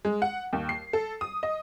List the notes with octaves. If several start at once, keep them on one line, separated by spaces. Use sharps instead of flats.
G#3
F#5
D#2
C7
A4
D#6
D#5